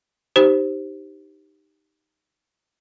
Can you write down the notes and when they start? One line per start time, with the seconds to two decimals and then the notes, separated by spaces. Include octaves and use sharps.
0.36 D#4 G4 C5